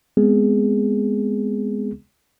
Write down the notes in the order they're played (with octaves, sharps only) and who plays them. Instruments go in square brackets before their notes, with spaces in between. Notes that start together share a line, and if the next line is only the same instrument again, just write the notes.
[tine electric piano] G#3 B3 C4 G#4